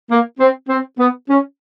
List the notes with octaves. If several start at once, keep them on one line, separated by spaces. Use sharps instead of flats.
A#3
C4
C4
B3
C#4